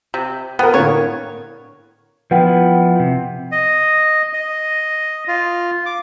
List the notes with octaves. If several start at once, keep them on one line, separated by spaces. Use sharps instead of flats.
C3
B3 A#4 B4 G5
A2 D3 A#3 C#5
F3 B3 E4 B4 F#5 G5
C3
D#5
D#5
F4
D6